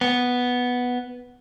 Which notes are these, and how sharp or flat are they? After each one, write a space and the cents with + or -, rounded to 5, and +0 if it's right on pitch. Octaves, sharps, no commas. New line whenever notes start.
B3 +0